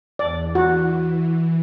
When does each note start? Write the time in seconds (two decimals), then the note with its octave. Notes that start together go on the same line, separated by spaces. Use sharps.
0.19 E2 D5
0.55 E3 F#4